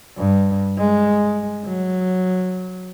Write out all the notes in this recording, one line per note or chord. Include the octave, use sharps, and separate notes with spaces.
G2
G#3
F#3